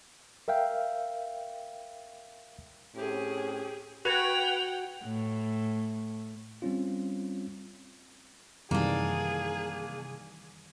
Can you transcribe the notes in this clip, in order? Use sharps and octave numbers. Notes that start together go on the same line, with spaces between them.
A#4 E5 F5 G5
A2 C4 C#4 G4 G#4
F#4 B4 F#5 G5 G#6 F7
A2
G3 C4 C#4 F4
F#2 C3 D#3 E3 G3 A#3 D4 G#4